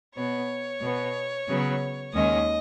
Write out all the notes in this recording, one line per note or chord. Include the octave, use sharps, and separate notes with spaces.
B2 B3 C#5
B2 B3
C#3 F#3 B3
D#2 D#3 G#3 C#4 D#5